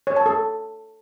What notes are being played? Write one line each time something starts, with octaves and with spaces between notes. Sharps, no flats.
C#5
A5
A4